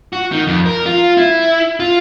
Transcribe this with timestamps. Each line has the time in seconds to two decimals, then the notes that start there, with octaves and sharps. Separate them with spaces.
0.13 F#4
0.32 D#3
0.47 F2
0.66 A#4
0.86 F4
1.17 E4
1.80 F4